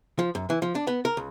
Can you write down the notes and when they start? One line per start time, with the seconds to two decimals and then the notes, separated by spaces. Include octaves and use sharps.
0.19 F3
0.35 F#2
0.50 E3
0.62 F3
0.75 D4
0.87 B3
1.05 A#4
1.17 C#2